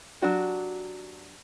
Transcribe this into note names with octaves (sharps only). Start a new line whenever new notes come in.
F#3 D4 F#4 G4